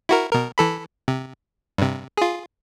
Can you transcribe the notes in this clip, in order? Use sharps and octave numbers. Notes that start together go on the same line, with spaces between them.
E4 F#4 A#4
B2 A#4
E3 A4 B5
C3
G2 C3
F4 G#4